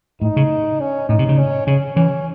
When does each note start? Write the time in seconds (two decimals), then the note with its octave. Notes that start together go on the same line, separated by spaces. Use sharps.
0.22 A2 D#4
0.36 C#3
0.80 C#4
1.09 A2 D#4
1.19 C3
1.29 C#3
1.38 C#4
1.67 C#3 C#4
1.96 E3 C#4